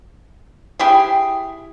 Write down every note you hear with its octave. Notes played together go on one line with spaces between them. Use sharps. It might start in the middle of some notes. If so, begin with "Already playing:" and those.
E4 G4 G#4